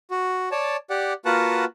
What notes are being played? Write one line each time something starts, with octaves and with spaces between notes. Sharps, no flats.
F#4
C#5 D5 A5
G4 D5 F#5
A#3 F4 F#4 B4 F#5 A5